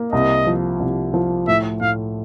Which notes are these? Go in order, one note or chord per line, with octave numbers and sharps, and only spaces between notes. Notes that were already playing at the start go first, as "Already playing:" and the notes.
Already playing: A#3
C2 D#5
F3
C2
F3
A2 E5
A2 F5